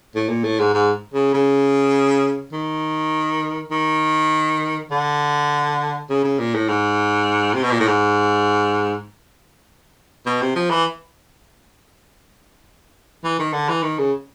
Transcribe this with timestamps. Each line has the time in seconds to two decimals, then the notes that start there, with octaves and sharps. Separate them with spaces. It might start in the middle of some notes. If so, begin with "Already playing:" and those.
0.15 A2
0.29 A#2
0.44 A2
0.60 G#2
0.74 G#2
1.14 C#3
1.34 C#3
2.53 D#3
3.71 D#3
4.91 D3
6.09 C#3
6.24 C#3
6.39 A#2
6.55 A2
6.69 G#2
7.54 C3
7.63 B2
7.71 A#2
7.80 A2
7.88 G#2
10.26 B2
10.42 C3
10.56 F3
10.70 E3
13.24 E3
13.39 D#3
13.53 D3
13.69 E3
13.83 D#3
13.99 C#3